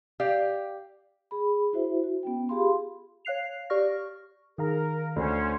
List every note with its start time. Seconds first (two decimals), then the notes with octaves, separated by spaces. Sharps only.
0.20 G4 D5 F5
1.31 G#4 B5
1.73 E4 F#4 C5 E5
2.04 F#4
2.23 B3 C#4 G5
2.49 F4 G4 G#4 F5 B5 C6
3.25 C#5 F5 F#6 C7 F7
3.70 G4 D5 C#6 F6 A#6
4.58 D#3 G#4 A#4 F5 A#5
5.16 D2 C#4 C5